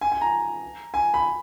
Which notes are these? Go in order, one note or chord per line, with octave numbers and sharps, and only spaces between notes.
G#5
G#5
A#5
G#5
B5